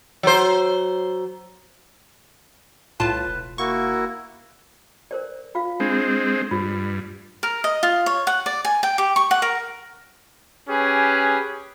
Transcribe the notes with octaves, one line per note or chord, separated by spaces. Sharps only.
F#3 C5
C2 A2 F4 B4 A5
E1
A#3 E4 F#4 C#6
A#4 C5 D5
F4 F5
G#3 C4 D4
G2 F4
A#4
D#5
F4
C#5
F#5
D5
G#5
G5
G4
C#6
F#5
A#4
C#4 G4 G#4 B4